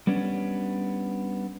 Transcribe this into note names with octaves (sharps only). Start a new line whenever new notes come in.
G3 B3 C#4 D4